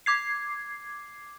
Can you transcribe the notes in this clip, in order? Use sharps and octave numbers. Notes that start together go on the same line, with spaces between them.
D6 G#6 C7